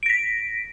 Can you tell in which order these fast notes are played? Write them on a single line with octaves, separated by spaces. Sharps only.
D7 A#6 B6